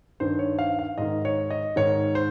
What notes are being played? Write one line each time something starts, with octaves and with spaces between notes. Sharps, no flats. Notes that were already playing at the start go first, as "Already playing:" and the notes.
G2 D#3 C5
C#5
F5
F5
G#2 D#3 D#5
C#5
D#5
G#2 D#3 C#5
C5